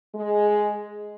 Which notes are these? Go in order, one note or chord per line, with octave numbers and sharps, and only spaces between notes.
G#3